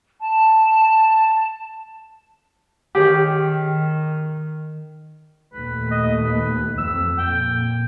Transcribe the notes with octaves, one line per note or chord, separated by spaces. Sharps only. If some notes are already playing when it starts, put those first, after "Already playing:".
A5
D#3 G4 G#4 C#5
D#2 A#2 A3 B4
D#5
B4
F2 E6
A#2 G5